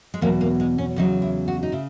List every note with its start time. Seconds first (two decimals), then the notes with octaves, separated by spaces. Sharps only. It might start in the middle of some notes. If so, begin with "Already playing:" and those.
0.14 G#3
0.21 E2 B2 F#3 A#3
0.41 A#3
0.60 G#3
0.78 C#4
0.96 E2 C#3 F#3 D#4
1.22 E4
1.48 F#4
1.63 D#4
1.72 C#3 E4